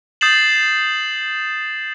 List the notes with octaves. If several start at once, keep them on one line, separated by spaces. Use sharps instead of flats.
D#6 G6 A6 C7 E7 F#7